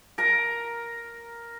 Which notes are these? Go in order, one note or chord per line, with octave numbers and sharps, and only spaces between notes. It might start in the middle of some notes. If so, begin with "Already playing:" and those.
A#4 A#5